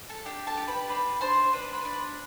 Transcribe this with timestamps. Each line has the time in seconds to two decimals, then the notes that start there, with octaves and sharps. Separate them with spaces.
0.09 A4 A5
0.25 D4 G4 G5
0.47 A4 A5
0.57 G4
0.67 B4 B5
0.89 D4 B4 B5
1.21 D4 C5 C6
1.53 D4 B4 B5
1.74 B4 B5
1.85 D4